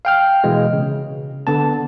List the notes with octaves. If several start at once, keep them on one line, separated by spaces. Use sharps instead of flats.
F5 G5 F6
B2 E3 G#3
C#3
D3 B3 A5